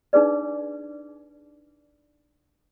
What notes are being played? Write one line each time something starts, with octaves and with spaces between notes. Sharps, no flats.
D4 D#4 G#4 B4 D5